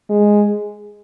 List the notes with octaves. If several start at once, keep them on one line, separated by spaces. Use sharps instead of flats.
G#3